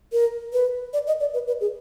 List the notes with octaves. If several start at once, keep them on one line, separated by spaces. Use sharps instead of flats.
A#4
B4
D5
D#5
D5
B4
B4
G#4